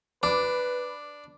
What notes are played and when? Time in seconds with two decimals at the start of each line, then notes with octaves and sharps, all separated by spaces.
0.23 D4 B4 D6